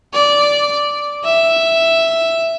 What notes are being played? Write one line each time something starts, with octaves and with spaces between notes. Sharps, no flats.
D5
E5